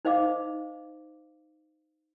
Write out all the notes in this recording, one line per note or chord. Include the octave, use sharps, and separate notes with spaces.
D#4 C5 D#5 F5 D6